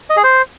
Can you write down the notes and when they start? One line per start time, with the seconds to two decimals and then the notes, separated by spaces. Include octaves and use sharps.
0.10 D#5
0.17 G#4
0.24 C5